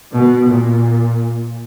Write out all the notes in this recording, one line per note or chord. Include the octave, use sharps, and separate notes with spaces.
B2
A#2